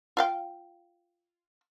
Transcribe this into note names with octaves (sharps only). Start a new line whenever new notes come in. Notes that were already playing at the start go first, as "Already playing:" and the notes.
F4 F5 G5